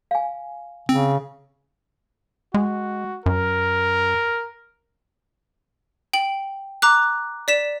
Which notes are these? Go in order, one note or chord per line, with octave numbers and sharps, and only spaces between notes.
F5 G#5
C#3 C4
G#3 F#4
F#2 A#4
G5 F#7
A#5 D6 F#6
D5 B6 E7